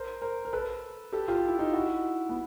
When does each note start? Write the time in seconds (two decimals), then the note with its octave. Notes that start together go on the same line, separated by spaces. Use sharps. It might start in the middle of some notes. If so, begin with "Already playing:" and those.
Already playing: A#4 C5
0.22 A#4 C5
0.45 A#4
0.53 A4 B4
1.13 G4 A4
1.28 F4 G4
1.48 E4
1.59 D#4 F4
1.73 E4 F#4
2.29 B3